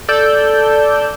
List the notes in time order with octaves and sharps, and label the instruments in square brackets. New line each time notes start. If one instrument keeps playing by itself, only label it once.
[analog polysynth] A4 D5 E6 G6